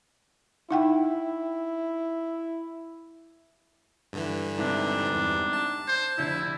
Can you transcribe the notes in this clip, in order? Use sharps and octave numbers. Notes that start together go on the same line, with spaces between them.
D#4 E4 F#5 G5
G2 D3 E3
G#2 C3 D4
E2 G2
A5
C5
F1 D3 E4 G6